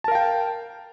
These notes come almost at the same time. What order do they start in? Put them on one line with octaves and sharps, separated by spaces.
A5 A#4 F5 G5